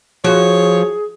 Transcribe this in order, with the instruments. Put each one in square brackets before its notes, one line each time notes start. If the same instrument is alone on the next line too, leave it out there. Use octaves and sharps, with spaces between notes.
[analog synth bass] F3 [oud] F#4 [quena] G#4 [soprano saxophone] C#5